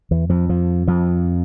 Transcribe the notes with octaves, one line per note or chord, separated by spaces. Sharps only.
E2 E3
F2 F3
F2 F3
F2 F3